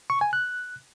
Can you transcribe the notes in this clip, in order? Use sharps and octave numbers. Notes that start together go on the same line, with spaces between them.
C#6
G#5
F#6